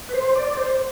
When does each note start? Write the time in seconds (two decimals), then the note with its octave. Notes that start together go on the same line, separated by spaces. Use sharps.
0.09 B4
0.14 C5
0.36 D5
0.57 C5